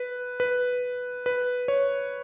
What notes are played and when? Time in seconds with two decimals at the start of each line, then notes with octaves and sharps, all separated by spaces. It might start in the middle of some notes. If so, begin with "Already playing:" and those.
Already playing: B4
0.40 B4
1.26 B4
1.68 C#5